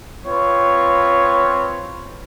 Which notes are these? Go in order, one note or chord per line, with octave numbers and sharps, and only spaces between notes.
C4 F4 B4 C#5